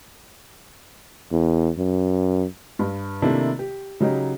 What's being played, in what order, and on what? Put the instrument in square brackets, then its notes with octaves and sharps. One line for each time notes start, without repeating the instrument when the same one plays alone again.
[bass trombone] E2
F#2
[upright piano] G2
C3 D#3 A3 A#3 D4 E4
G4
C#3 F#3 D#4 G4